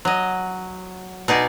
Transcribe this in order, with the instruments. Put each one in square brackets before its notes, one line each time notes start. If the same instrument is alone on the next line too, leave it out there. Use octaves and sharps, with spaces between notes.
[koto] F#3 D#5
B2 D#4 G#4 D5